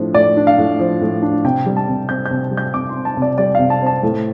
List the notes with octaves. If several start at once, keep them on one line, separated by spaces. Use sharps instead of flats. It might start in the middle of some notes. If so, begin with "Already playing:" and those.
Already playing: A2 F3 D4
A2 D5
D4
F5
A2
F3
A2
D4
C3 G5
G3
A5
C3
C4 G6
C3 G6
G3
G6
C3 D6
C6
C4
A5
C3
D5
G3 D5
C3 F5
A5
C4
A5
A2